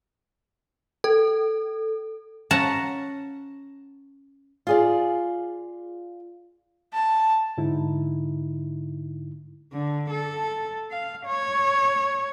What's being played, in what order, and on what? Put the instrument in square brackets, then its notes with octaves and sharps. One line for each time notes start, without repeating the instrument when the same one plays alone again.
[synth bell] A4
[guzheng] C#4 F#5 A5 A#5
[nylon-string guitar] F4 G#4 D5
[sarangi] A5
[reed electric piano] G#2 D3 D#4 E4
[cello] D3
A4
F5
C#5